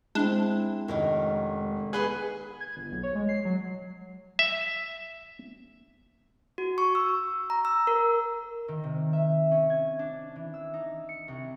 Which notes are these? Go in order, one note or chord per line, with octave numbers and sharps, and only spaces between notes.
G#3 C4 D4 E4
F1 D#3 C#4 A#4
B3 G#4 B4 C6 C#6
G#6
G1
B1
C#5
G#3
C7
F#3
E5
F#4
C#6
E6
A#5
E6
A#4
D#3
C3
E5
C#4
G#6
D4
E3
E6
D#4
C#7
C2